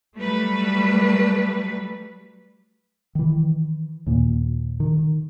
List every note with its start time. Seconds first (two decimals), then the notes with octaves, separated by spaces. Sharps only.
0.18 F#3 G3 A3 B4
3.15 D#3 E3
4.06 D#2 A#2
4.80 D#3